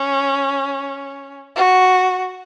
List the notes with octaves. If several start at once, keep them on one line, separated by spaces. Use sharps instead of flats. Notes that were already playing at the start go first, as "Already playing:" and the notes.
Already playing: C#4
F#4